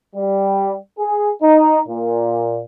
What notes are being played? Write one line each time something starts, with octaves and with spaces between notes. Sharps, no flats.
G3
G#4
D#4
A#2